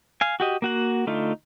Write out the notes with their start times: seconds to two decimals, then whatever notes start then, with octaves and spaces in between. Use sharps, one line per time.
0.21 F5 G#5
0.40 F#4 G4 D#5
0.62 A#3 F#4 F#5
1.07 D3 A3 D#4 F4